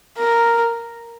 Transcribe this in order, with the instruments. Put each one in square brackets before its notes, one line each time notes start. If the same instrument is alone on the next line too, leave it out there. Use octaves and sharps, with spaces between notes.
[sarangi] A#4